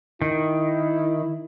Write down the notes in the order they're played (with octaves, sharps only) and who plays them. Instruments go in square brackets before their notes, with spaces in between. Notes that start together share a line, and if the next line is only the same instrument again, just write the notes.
[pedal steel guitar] D#3 [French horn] E4